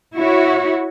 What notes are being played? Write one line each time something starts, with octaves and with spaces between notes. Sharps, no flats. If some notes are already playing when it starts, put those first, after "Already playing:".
E4 F#4 C#5